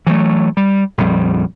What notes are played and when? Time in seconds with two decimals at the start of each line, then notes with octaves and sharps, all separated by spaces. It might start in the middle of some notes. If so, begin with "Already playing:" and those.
0.07 E3 F#3 G3 A3
0.57 G3
0.98 A#1 F2 G3